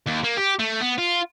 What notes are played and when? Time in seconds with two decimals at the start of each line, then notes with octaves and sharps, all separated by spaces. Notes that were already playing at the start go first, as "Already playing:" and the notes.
0.06 D#2
0.24 A#3
0.37 G4
0.59 A3
0.81 B3
0.98 F4